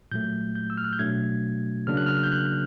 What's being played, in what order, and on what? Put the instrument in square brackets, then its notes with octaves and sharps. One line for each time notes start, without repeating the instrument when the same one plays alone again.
[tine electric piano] A#2 F#3 A3 G6
G6
E6
F6
F#6
G6
B2 F#3 A3 D4 G#6
C#3 F#3 A#3 D4 F6
F#6
F6
G6
F#6